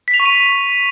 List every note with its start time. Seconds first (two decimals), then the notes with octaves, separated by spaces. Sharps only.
0.08 B6
0.14 F7
0.20 C#6
0.25 D#7